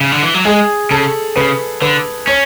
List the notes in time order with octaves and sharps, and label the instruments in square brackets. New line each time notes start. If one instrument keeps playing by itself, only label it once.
[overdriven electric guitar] C#3
D3
E3
F#3
[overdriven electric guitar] G#3 [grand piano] G#4
[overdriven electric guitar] C#3 [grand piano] A4
[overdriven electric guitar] C#3 [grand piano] B4
[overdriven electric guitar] D3 [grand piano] B4
[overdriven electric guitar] C#4 [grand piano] C#5